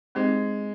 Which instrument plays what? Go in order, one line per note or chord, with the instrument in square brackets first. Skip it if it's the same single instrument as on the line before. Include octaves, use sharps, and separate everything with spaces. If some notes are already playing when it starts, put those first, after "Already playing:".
[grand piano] G#3 [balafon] C4 D#4 G4 C5